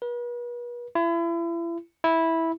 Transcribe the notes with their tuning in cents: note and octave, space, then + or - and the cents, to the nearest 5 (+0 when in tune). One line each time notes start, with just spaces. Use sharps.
B4 -40
E4 +35
E4 -10